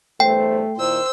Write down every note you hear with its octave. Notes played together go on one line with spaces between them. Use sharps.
E2 G2 A3 C5 G5
A#2 D#3 E4 C5 E6